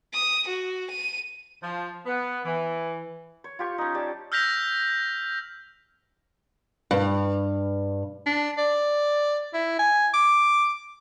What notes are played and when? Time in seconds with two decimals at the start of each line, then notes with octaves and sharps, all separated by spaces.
0.14 D#6
0.47 F#4
0.90 D#7
1.62 F3
2.06 B3
2.45 E3
3.44 C#5
3.59 F4 G4 C#6
3.78 C#4 D#4
3.94 G3 G4 A5
4.32 E6 F6 G6 A#6 B6 F7
6.91 G2
8.26 D4
8.58 D5
9.54 E4
9.79 G#5
10.14 D6